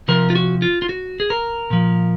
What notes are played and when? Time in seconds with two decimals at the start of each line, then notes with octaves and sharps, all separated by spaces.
0.08 C3 F3 A#4
0.30 F4
0.35 F#4
0.62 F4
0.82 F4
0.89 F#4
1.20 G#4
1.30 A#4
1.70 A#2 F3